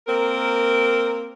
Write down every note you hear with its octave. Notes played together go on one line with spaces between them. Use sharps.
A#3 C4 A#4